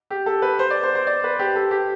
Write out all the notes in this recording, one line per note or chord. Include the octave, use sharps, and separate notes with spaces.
G4
A4
B4
C5
D5
C5
C5
D5
B4
G4
A4
G4